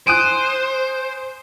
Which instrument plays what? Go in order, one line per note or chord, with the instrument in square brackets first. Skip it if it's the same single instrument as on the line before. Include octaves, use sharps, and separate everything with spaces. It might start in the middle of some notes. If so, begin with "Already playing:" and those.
[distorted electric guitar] C5 [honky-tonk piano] G#5 D#6 F#6 [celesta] D7 D#7